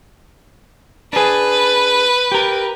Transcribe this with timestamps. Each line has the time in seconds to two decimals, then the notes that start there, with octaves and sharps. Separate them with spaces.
1.13 D4 G#4 B4
2.32 G4 A#4